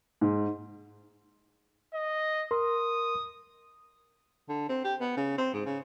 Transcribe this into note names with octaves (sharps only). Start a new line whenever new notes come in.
G#2
D#5
A#4 C6 D#6
D3
C4
G4
B3
C#3
C4
G#2
C#3